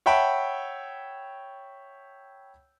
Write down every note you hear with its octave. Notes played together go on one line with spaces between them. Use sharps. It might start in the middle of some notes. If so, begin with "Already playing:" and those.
C#5 E5 F#5 G5 A5 B5